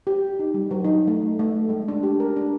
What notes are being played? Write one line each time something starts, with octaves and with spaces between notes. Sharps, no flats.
G4
D#4
G3
F#3
D#4
A3
A3
G#3
D4
G4
A#4
D4